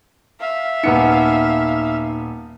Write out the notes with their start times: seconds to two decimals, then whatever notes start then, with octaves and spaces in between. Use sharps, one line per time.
0.40 E5 F5
0.84 D#1 B3 D#4 C#7